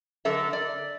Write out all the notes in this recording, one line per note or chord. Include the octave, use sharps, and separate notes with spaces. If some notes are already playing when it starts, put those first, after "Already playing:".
D3 F#3 A4 A#4 E5
D5